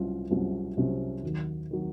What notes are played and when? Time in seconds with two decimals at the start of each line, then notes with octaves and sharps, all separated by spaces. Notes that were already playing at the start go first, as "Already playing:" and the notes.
Already playing: C2 C3 F#3 C#4 F4
0.31 C2 C3 F#3 C#4 F4
0.77 C2 C3 F#3 C#4 F4
1.23 D#2 D#3 F#3
1.71 D#3 F#3